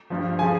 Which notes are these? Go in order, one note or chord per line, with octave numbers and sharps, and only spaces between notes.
G2 F3
C#3 F3 G#5